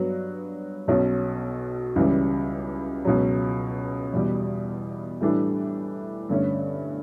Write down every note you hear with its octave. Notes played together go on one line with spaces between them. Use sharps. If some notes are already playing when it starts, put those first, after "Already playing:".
Already playing: G2 F#3 B3 F#4
B1 B2 F#3 C#4
C#2 C#3 E3 G3
C#2 B2 F#3
E2 B2 G3
A2 E3 G3 D4 A4
G2 D3 A3 C#4